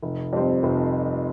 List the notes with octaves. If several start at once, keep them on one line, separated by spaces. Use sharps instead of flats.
F1
F2 C3 G3 C4
F1